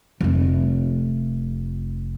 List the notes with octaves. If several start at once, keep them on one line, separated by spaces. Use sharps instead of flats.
F1 A3